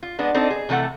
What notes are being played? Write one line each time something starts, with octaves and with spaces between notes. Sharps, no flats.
F4
G#3 B3 D4
C4 D4 D#4 A4
G#4
C3 E3 A3 A4 F#5